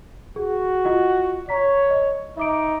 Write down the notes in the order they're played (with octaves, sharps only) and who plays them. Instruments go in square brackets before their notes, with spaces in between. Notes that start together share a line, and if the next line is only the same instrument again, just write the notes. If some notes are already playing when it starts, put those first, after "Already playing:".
[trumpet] F#4 [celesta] G#4
[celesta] F4 D#5 F#5
[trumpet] C#5 [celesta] A#5 B6
[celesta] D#5
[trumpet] D#4 [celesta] E5 D6 D7